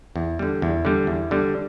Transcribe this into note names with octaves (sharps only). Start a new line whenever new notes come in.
E2
D3 G3
E2
D3 G3
E2
D3 G3